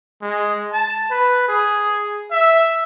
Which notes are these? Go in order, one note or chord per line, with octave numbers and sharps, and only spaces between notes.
G#3
A5
B4
G#4
E5